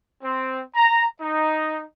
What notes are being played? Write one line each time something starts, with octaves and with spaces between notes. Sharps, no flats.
C4
A#5
D#4